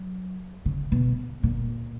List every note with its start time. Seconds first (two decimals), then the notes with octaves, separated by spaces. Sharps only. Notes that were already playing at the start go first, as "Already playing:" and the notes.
Already playing: F#3
0.66 C#3
0.92 B2
1.43 A#2